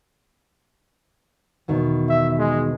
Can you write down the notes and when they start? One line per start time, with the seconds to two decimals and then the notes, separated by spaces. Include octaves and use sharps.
1.68 E2 B2 D#3
2.09 E5
2.39 G#3